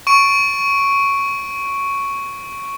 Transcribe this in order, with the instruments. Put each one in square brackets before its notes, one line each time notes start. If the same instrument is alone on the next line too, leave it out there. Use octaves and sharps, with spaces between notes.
[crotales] C#6 D7